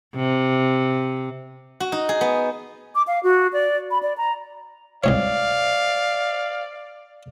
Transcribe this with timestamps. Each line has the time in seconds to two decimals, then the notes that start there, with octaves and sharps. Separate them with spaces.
0.15 C3
1.80 F#4
1.92 D#4
2.09 G#4
2.21 B3
2.95 D6
3.07 F5
3.23 F#4
3.53 D5
3.91 B5
4.03 D5
4.18 A#5
5.04 C2 G#2 C#5 D5 F5